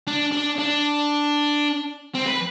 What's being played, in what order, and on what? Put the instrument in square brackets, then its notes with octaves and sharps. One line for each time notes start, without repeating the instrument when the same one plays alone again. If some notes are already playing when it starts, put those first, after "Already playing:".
[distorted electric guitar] D4
D4
D4
C4
B4